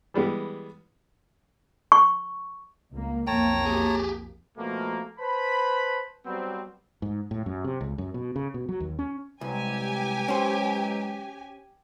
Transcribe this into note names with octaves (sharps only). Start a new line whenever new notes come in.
E3 G3 G#3 B3
C#6
C#2 A#3
B1 F2 A#3 C#5 G5 A5 A#5
G4 G#4
B2 F3 A3 A#3
B4 C5 A5 B5
F#3 G3 B3 C4
G#2
A2
F#2
C3
C#2
F#2
B2
C#3
B2
F#3
D#2
C#4
C2 E3 F#3 G#3 G4 G#5
C#4 C5